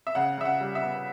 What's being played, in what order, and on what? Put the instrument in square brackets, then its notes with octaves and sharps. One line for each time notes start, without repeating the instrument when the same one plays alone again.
[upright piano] E5
C#3 F#5
C#3 E5
F#5
G3
E5
B3